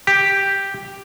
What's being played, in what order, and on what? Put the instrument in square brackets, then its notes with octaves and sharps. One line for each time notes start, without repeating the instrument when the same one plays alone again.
[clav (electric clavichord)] G4